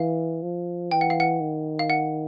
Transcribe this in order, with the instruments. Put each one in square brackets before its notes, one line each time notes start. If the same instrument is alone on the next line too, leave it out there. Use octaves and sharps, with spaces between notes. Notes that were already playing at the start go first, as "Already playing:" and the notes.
Already playing: [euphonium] E3 [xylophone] F5
[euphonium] F3
[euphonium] E3 [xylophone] G5
[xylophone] F#5
F5
F#5
[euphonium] D#3
[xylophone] F5
F#5